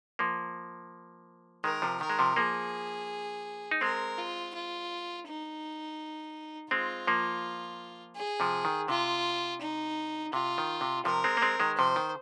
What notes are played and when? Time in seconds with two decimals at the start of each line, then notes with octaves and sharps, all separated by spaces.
0.19 F3 A#3
1.64 D#3 G#3 A#4
1.82 C3 F3
2.01 D#3 A#4
2.10 G#3
2.19 C3 F3
2.36 F3 A#3 G#4
3.71 D#4
3.81 G#3 C4 A#4
4.18 F4
4.54 F4
5.27 D#4
6.71 G#3 C4 F4
7.07 F3 A#3
8.16 G#4
8.40 C3 F3
8.65 D#3
8.88 C3 F4
9.61 D#4
10.33 C3 F4
10.58 D#3
10.81 C3
11.05 C3 F3 A#4
11.24 G#3 C4
11.37 A#3
11.42 G#3 C4
11.60 D#3 G#3
11.78 C3 F3 C5
11.96 D#3